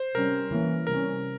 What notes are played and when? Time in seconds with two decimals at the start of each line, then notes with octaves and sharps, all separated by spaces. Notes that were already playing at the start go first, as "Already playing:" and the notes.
Already playing: C5
0.14 C3 G3 C#4 A#4
0.51 E3 A#3 C#4
0.87 C3 G3 C#4 A#4